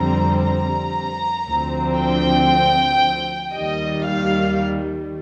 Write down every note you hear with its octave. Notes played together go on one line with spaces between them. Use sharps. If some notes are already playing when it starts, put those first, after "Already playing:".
Already playing: F2 D3 G3 C4 A#5
A#5
D2 D3 F3 C4
G5
D#2 D#3 G3 D#5
F5